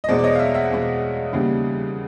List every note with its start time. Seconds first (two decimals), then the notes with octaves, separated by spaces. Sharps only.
0.04 D#5
0.08 E2 B2 G#3 B3 C5 D5
0.19 D5
0.24 C#5 D#5
0.35 F5
0.39 D5 E5
0.54 E5 F#5
0.71 E2 B2 G#3 B3
1.32 D#2 C#3 E3 G3 B3